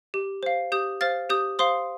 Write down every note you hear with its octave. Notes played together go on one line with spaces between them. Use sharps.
G4
C5 F5
G4 D#6 G6
C5 F5 F6 A6
G4 D#6 G6
C5 F5 C6 D#6